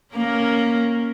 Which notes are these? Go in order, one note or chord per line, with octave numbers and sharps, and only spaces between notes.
A#3 C#4 A#4